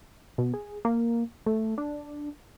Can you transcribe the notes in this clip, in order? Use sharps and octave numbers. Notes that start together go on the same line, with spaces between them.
B2
G#4
A#3
A3
D4